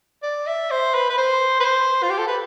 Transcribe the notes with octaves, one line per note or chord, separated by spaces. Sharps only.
D5
E5
C5
B4
B4
C5
B4
C5
F4
G4
A4
B4